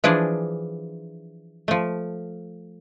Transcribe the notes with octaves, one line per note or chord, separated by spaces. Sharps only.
E3 F3 D4 G#4 D5
F3 A3